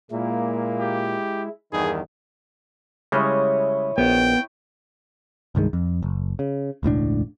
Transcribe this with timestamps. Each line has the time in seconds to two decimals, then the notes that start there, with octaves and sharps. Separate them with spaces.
0.11 A#2 G#3 A#3 E4
0.80 G4
1.73 E2 G2 D#3 G#4 B4
3.12 C#3 G3 G#3 E4 C#5 D#5
3.98 A#1 B3 G5
5.55 C2 G2 D#3 G#3
5.73 F2
6.03 F#1
6.39 C#3
6.83 E1 C#2 A2 D4